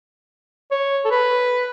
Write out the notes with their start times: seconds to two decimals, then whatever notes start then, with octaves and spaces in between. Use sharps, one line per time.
0.71 C#5
1.05 A4
1.11 B4